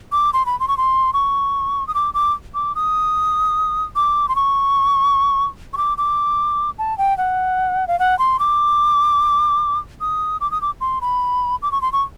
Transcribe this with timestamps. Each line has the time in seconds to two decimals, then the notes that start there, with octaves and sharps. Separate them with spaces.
0.12 D6
0.33 C6
0.46 B5
0.60 C6
0.68 C#6
0.77 C6
1.13 C#6
1.87 D#6
1.94 D6
2.14 D6
2.54 D6
2.75 D#6
3.96 D6
4.29 C6
4.36 C#6
5.73 C#6
5.77 D6
5.98 D6
6.78 A5
6.98 G5
7.18 F#5
7.88 F5
7.99 F#5
8.19 C6
8.39 D6
10.01 D#6
10.41 D6
10.51 D#6
10.62 D6
10.81 C6
11.01 B5
11.62 D6
11.72 C#6
11.81 C6
11.92 C#6